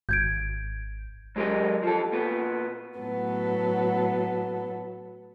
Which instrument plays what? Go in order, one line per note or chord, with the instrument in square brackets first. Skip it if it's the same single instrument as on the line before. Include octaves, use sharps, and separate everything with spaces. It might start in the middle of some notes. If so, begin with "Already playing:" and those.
[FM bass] G#1 [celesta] G6 G#6 D7
[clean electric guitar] F#3 G#3 G4 A#4 D#5
F3 A4
A#2 B3
[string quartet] A2 F#3 B3 A4